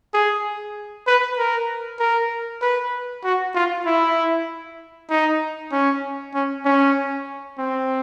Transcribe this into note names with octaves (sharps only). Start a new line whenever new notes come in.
G#4
B4
A#4
A#4
B4
F#4
F4
E4
D#4
C#4
C#4
C#4
C4